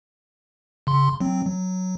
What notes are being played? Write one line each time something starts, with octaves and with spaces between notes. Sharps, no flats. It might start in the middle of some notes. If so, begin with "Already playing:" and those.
C#3 C6
F#3 C4
F#3